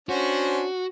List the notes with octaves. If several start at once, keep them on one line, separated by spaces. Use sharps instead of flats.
C#4 D4 F#4 C5